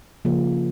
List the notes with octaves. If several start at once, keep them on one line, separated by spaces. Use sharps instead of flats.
C#3 F3 A#3